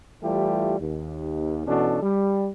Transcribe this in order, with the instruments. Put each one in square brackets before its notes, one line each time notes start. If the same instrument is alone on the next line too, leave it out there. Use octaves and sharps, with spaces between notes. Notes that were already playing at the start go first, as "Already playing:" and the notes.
[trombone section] E3 G3 A3 E4 F4 G4
D#2
B2 E3 C#4 D4 F#4 A4
G3